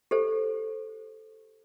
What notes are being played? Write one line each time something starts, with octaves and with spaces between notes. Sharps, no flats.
G4 A4 C5